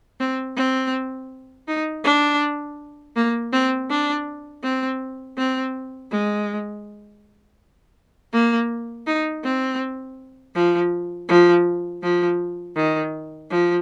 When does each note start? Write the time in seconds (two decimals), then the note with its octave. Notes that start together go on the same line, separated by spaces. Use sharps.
0.20 C4
0.57 C4
1.68 D#4
2.04 D4
3.16 A#3
3.52 C4
3.90 D4
4.63 C4
5.37 C4
6.11 G#3
8.33 A#3
9.07 D#4
9.44 C4
10.55 F3
11.29 F3
12.02 F3
12.76 D#3
13.50 F3